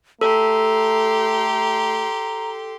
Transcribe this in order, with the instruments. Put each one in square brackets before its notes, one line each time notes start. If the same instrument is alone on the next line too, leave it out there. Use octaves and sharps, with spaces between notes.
[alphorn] A3 [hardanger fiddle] G4 C6 [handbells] A4 [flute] A#5